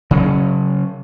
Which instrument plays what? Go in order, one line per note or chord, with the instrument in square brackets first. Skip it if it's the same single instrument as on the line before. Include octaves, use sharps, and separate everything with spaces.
[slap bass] C#3 F#3 C#4